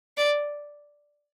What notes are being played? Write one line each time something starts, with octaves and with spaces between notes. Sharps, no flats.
D5